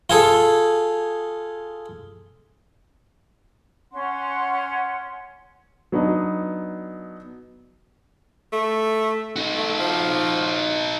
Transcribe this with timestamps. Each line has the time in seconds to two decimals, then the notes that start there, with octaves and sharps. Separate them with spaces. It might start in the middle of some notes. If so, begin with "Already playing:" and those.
0.10 F4 G#4 A4
3.92 C#4 F#5 C6
5.92 F#3 B3 D4 D#4
8.52 A3
9.36 D#4 F#4
9.58 A3
9.79 F3